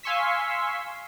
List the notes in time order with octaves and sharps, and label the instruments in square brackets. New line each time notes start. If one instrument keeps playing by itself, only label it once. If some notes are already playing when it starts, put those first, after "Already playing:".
[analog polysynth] F5 G#5 C6 C#6 E6 B6